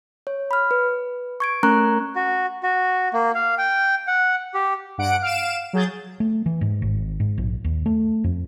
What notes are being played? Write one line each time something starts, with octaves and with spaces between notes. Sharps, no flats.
C#5
B5 F6
B4
C#6 G#6 D7
A3 C#4 A#4 A#5 C#6 F#6
F#4
F#4
A#3
F5
G5
F#5
G4
G2 F#5 D7
F5 D7 E7
F#3 G#4 G6 A6
A3
E3
G#2
G#1
G#2
A#1
D#2
A3
F2